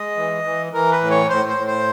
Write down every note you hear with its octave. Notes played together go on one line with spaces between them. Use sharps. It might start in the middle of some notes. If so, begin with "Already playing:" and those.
Already playing: G#3 D#5
E3
E3
E3 A#4
B4
A2
C#5
A2 C5
C5
A2
C5